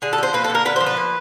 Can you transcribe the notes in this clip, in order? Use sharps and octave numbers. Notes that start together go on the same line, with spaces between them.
D3 G#4
A4
F3 C5
A#3 B4
A4
D3
A#4
D3 B4
F3 C5
B4
A#3